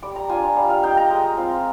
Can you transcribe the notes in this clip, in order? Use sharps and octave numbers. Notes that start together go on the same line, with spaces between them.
G3 D6
A#5
D4 F4 G#5
G3 F5
F5
A#3 D#4 G5
A#5
G#3
C4 F4